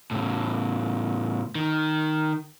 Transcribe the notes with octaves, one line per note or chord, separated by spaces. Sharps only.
A2 C#3
D#3